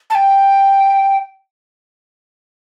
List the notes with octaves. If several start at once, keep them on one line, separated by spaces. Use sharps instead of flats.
A5
G5